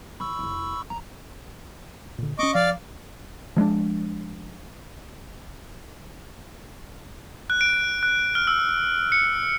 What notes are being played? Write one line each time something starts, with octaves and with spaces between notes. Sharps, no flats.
E3 B5 C#6 E6
F1 E4
E2 A#5
A#2 D3
B3 C#4 D#5 C#6 D6
F3 D5 F5
F3 G#3 A3 D4
F#6
D7
F#6
F6
E6
C#7